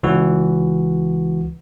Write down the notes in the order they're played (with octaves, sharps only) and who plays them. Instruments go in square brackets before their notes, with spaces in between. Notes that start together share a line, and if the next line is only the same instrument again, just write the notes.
[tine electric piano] C#2 E3 F#4